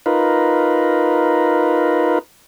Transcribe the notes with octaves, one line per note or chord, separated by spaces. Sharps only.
D#4 F4 A#4 B4